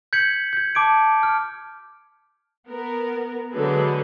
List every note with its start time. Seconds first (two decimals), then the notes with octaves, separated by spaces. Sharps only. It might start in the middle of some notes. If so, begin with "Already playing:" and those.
0.13 G6 G#6 B6 C#7 F#7
0.53 G6 G#6
0.75 A5 D6 G#6 D7
1.23 F6
2.68 B3 A#4
3.52 D3 F#3 G#3 G#4 A4 B4